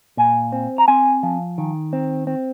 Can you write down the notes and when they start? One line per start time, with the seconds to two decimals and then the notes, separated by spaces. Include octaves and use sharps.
0.17 A#2 G#5
0.52 C4
0.78 A#5
0.88 C4 G#5
1.23 F3
1.58 D#3
1.93 C4
2.27 C4